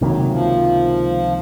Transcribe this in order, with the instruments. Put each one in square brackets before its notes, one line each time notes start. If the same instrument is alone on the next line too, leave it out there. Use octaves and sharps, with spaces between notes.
[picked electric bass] C#2 C3 D#3 A#3 [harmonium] F#3
[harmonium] F3